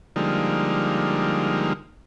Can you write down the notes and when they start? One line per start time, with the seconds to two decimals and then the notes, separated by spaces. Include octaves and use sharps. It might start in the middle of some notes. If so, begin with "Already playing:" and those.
0.16 D3 F3 G3 G#3 A#3 D#4